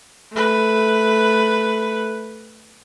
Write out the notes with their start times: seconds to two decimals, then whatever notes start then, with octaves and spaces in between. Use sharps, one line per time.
0.33 A3 B4